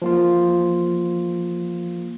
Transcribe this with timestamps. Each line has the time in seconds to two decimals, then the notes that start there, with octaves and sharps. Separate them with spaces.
0.02 F3 A#3 F4